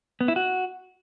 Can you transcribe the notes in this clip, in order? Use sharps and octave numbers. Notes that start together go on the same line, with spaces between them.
B3
E4
F#4